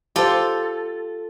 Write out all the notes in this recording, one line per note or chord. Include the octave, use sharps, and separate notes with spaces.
F4 G4 A4 C5